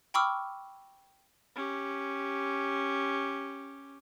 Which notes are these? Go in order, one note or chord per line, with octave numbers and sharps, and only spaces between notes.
G5 B5 C#6 D6 E6 F6
C#4 G4